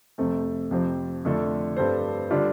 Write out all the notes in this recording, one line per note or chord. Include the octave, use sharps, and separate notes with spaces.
F2 C3 A3 C4 A4
F2 C3 F3 C4 G4
F2 D3 A3 F4 A4
G2 G3 C4 A4 C5
D3 G3 D4 F4